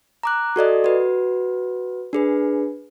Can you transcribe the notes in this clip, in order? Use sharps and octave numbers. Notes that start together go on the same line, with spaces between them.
A#5 D6 F#6
F#4 A4 D5 D#5
F#4 B4
D4 G#4 B4